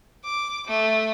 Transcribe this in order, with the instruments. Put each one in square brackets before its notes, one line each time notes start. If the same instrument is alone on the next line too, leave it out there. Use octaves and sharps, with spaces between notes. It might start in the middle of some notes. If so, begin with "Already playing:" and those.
[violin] D6
A3